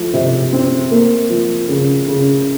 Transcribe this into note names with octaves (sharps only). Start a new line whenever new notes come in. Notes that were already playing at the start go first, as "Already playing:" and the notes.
Already playing: F3 A3
C3
C4
A#3
F3
C#3
C#3